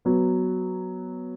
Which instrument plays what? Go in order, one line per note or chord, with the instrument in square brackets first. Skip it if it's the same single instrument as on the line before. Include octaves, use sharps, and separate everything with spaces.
[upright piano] F#3 B3